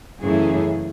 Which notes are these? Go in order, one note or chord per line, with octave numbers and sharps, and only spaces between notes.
F#2 C#3 E3 A3 C#4 G#4